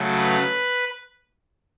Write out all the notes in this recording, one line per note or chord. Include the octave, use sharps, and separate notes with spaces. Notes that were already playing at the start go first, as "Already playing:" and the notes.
Already playing: C#3 F#3 A3
B4